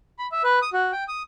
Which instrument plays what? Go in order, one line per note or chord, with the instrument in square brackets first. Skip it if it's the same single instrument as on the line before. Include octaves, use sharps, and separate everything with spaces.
[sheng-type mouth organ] B5
E5
B4
D#6
F#4
G5
D#6